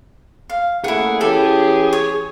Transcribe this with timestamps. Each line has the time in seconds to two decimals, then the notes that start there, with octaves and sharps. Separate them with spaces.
0.50 F5
0.84 C#3 A3 A#3 E4 G#4 F#5
1.21 E3 C#4 G4 A4
1.93 C#5